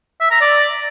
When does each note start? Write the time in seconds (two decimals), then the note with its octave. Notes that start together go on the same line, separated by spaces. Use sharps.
0.20 E5
0.31 A#5
0.41 D5